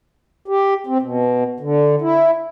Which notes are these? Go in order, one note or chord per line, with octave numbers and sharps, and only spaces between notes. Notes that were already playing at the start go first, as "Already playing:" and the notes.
G4
C4
B2
D3
E4